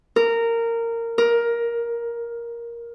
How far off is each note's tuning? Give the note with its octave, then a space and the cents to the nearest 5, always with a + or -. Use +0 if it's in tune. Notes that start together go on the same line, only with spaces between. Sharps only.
A#4 -15
A#4 +10